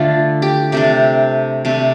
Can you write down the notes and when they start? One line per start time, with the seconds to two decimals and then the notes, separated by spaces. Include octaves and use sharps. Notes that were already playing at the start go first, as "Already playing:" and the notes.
Already playing: D3 A3 D4 F4
0.42 G4
0.72 C3 A3 D4 G4
1.65 C3 A3 D4